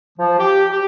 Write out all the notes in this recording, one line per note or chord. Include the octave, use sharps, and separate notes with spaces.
F3
G4
G4